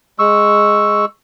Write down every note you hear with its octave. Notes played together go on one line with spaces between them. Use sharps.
G#3 C#6 E6